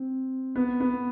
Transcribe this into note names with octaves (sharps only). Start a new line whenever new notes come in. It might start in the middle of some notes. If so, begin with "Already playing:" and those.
Already playing: C4
B3
B3